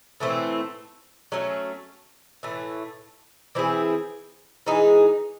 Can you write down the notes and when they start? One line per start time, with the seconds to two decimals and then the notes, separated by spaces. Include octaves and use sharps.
0.20 A2 E3 A3 C4
1.32 F#3 A3 C#4
2.43 A2 E3 A3
3.55 E3 C4 E4 G#4
4.66 E3 G#3 D#4 G#4